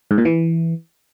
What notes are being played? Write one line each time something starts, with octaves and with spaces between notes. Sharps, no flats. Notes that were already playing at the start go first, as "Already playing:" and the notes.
G#2
A#2
E3